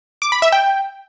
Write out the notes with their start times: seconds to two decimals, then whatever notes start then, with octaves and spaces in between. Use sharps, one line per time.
0.22 D6
0.32 B5
0.42 E5
0.52 G5